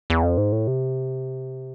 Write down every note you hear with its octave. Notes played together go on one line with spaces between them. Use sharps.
E2
F2
G#2
A2
C3